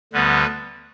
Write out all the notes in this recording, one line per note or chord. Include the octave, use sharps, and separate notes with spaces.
D2 D3 G3 B3 B4